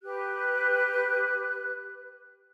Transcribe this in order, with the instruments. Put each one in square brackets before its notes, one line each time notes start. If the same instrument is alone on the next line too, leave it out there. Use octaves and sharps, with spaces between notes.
[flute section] G4 B4 F#6